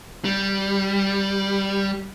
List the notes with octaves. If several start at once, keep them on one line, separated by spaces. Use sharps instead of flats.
G3